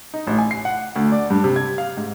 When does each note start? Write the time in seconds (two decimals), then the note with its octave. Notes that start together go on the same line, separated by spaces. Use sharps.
0.14 D#4
0.27 A1
0.39 G#5
0.51 C7
0.65 F#5
0.96 D2
1.12 D5
1.30 G2
1.44 C3
1.56 G#6
1.78 F5
1.97 G#2